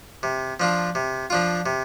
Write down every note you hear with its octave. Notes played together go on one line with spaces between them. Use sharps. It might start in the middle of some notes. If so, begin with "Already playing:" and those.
C3
F3 D4 F4
C3
F3 D4 F4
C3